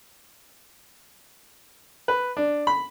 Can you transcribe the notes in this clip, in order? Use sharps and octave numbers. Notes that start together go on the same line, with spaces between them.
B4
D4
B5